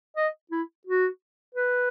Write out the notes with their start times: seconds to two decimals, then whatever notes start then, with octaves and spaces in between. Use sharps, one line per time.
0.17 D#5
0.51 E4
0.86 F#4
1.55 B4